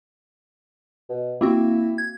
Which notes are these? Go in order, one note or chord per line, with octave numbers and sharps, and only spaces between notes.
B2
A#3 C4 E4 F#4
G#6